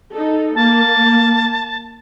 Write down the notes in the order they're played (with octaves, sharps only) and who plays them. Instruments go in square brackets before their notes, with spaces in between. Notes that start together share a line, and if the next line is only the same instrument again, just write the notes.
[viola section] D#4 A4
[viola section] A#3 [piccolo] A5